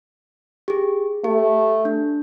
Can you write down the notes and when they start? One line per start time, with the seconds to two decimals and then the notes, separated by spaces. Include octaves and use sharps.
0.68 G4 G#4
1.24 A3 G4
1.85 D4